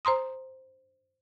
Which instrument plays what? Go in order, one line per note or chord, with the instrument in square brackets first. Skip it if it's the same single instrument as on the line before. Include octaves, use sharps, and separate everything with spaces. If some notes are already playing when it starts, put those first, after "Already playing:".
[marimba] C5 A#5 C6 D#6